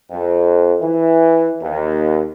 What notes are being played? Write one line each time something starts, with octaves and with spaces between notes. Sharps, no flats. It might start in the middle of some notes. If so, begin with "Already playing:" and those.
F2
E3
D#2